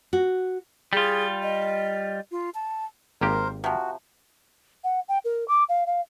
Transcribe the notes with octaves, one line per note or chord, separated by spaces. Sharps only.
F#4
G3 F4 G#4
D#5
F4
A5
G#1 A#3 G4 A#4 C5
C3 F3 F#4
F#5
G5
A#4
D6
F5
F5